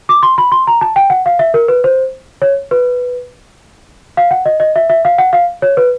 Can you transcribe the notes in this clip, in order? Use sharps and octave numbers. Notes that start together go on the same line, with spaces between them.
D6
C6
B5
C6
A#5
A5
G5
F#5
F5
E5
A#4
B4
C5
C#5
B4
F5
F#5
D#5
D#5
E5
E5
F5
F#5
F5
C#5
B4